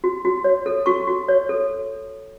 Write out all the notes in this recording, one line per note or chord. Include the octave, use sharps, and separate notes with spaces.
F#4
F#4
C#5
A4
F#4 C#6
F#4
C#5
A4